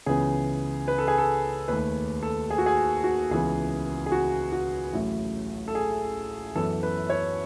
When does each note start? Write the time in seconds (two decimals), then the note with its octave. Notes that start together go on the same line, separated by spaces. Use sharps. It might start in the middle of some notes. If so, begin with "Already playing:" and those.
0.06 C#2 C#3 E3 B3 G#4
0.88 B4
0.98 A4
1.08 G#4
1.18 A4
1.68 D#2 D#3 A3 B4
2.22 A4
2.50 G#4
2.58 F#4
2.66 G#4
3.04 F#4
3.31 C#2 C#3 E3 B3 G#4
4.06 G#4
4.12 F#4
4.52 F#4
4.93 A1 A2 F#3
5.68 A4
5.75 G#4
6.55 F#2 E3 B3 A4
6.83 B4
7.10 C#5